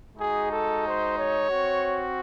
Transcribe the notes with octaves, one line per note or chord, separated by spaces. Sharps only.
G#3 D#4 F#4 G#4
A4
C5
C#5
C4 F#4